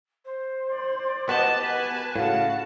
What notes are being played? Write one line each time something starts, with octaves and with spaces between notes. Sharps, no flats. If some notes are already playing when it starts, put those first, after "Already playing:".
C5
D5
B3 F#4 G4 D#5 A5
B4 G#5 A5
A2 C#3 F#4 F5 A5